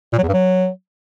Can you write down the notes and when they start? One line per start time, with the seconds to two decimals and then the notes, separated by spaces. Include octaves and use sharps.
0.13 A#2
0.18 F#3
0.23 E2
0.28 G2
0.33 F#3